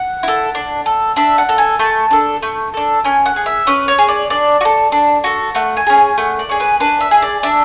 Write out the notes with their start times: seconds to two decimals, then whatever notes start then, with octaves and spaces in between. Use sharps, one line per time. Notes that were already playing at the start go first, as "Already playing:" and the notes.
Already playing: F#5
0.23 E4 A4
0.55 D4
0.86 A4
1.16 D4 E5
1.38 F#5
1.49 A4
1.58 G#5
1.79 A3 A5
2.11 D4 A4
2.42 A3
2.74 D4 A4
3.04 C#4 G#5
3.26 F#5
3.36 G#4
3.46 E5
3.67 C#4 B4
3.88 C#5
3.98 G#4
4.08 D5
4.30 D4 D5
4.61 F#4
4.65 A4
4.92 D4
5.24 F#4 A4
5.55 A3 F#5
5.77 G#5
5.87 C#4 G#4
5.97 G#5
6.18 A3 F#5
6.39 D5
6.49 C#4 G#4
6.60 B4
6.80 D4 B4
7.01 E5
7.11 G#4
7.22 D5
7.43 D4 E5